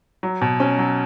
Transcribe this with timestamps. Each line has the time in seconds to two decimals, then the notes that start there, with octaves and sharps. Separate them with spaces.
0.23 F#3
0.41 B2
0.60 C#4
0.78 F#3